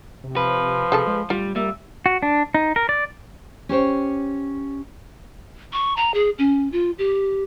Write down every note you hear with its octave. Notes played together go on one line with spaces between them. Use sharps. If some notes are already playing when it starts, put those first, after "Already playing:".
C3
F3 B4
C3 G#4 A4 A5
G#3
D1 G3 F4
G3 A#3 E5
F#4
D4
D#4
A#4
D5
C#4 G4 C5 C#5
C#6
A#5
G#4
C#4
F4
G4